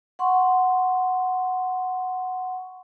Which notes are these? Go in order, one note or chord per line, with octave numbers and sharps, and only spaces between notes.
F#5 C6 C#6